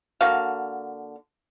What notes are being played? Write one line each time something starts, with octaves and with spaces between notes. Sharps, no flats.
D3 A#3 F#4 F5